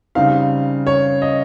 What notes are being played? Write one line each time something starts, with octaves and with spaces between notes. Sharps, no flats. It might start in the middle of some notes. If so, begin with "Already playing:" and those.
C#3 G3 C4 D#4 F5
C#5
D#5